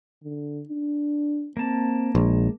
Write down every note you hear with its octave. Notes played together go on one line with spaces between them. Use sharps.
D3
D4
A#3 C4 A5
A#1 G#3